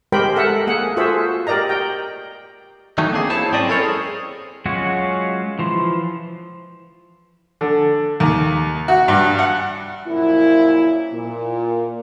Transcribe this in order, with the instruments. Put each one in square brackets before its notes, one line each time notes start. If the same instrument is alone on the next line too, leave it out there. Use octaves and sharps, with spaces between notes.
[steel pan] G#3 G4 A#4 C5 G5 B5
A4 A#4 E5 F#5
A#3 G#4 F#5
F4 F#4 G#4 A4 C5 E5
G4 A#4 D5 D#5 A#5
G5
[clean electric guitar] D#3 E3 F#3 A3 D#4
A#3 C4 D4 G#4
E4 C5 C#5 A5
G#2 F#3 C4 C#4 D5 D#5
E4 A4 A#4 C5 C#5
G#4
[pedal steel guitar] F#3 G#3 C#4 F4 F#4
E3 F3 C6
[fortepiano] D3
D#2
F#4
G2
F#5
[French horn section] F#2 A#2 F3 E4
A#2